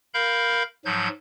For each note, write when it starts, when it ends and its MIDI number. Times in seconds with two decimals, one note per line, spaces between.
0.14 0.63 70
0.14 0.63 77
0.14 0.63 83
0.14 0.63 91
0.85 1.08 44
0.85 1.08 53
0.85 1.08 54
0.85 1.08 91
0.85 1.08 92